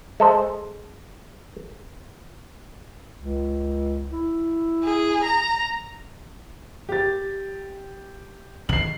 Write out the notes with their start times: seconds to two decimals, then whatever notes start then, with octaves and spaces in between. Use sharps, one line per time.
0.20 G#3 A4 C5
3.18 C#2
4.11 E4
4.84 G#4
5.24 A#5
6.89 G4 A6
8.69 D#3 C7 F#7